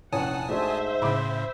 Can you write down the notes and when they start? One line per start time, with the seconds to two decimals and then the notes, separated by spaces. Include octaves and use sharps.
0.13 F1 A#1 E2 C#4 F#5 G#5 A5 D#6
0.49 G#2 A3 D4 F#4 C5 E5
1.02 A2 C#3 B5 D6